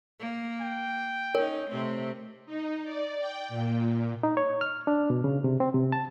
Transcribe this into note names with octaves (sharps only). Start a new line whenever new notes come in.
A#3
G5
C#4 D#4 A#4 C#5
C3 A3 C4
D#4
D5
G5
A#2
D#4
C#5
F6
D4
B2
C#3
C3
C4
C3
A5